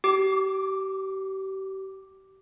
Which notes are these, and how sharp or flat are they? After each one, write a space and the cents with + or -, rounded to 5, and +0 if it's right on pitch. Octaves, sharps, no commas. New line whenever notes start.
G4 -35 D6 +0